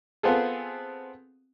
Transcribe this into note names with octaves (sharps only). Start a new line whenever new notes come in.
B3 C4 F4 G#4 A4